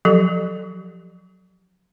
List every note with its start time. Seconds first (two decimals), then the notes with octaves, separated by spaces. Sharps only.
0.05 F3 F#3 G4 A4